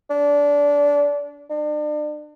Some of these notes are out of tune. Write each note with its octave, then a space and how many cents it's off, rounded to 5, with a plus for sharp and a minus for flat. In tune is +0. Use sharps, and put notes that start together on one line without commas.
D4 -20
D4 +35